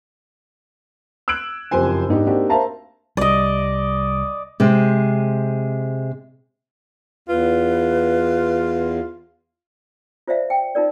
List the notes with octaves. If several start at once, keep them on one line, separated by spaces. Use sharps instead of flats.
E6 F#6 G#6 D7 F#7
F#1 F2 F3 G4 C5 G#5
G#2 B3 D4 D#4 G4
A#3 C4 D4 D#4 F#4 G4
A#4 C5 E5 F5 A5 A#5
C2 G3 D5 D#5
C3 G#3 C4
E2 F4 B4
F4 C5 D5 E5 F5
G5
D#4 F4 A#4 D5